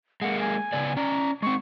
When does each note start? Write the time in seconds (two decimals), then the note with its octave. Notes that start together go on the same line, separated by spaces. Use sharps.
0.22 G#3 A#3 F#5
0.40 G#5
0.73 C#3 B3 D5
0.97 C#4 D5 A#5
1.42 G#3 C4 C#6